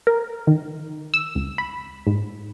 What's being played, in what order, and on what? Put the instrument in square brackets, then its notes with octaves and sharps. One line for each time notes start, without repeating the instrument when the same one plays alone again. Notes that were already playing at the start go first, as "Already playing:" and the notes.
[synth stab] A#4
D#3
E6
C#2
B5
G#2